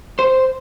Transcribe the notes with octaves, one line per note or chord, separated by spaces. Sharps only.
C5